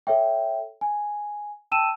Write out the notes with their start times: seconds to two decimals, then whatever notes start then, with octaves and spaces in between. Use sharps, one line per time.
0.07 A4 C#5 E5 G5
0.81 G#5
1.72 G5 A5 E6 D#7 E7